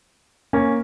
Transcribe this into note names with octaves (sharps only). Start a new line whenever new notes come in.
A#3 C#4